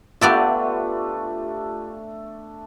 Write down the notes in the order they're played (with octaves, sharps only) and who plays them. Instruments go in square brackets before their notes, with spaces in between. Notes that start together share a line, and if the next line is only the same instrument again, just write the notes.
[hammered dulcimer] A3 D4 [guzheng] B3 D5 E5 [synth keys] F4 G4